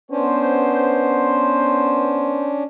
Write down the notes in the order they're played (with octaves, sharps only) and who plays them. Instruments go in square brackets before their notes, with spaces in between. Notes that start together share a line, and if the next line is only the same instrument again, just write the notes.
[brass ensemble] B3 C5 [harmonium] C#4 D4